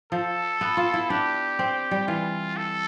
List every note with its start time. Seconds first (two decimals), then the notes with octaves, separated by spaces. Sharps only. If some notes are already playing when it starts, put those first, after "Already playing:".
0.12 F3 A4
0.61 B3
0.77 F4
0.94 E4
1.10 D4 G4
1.59 C4
1.91 G3
2.08 E3 F4
2.57 A4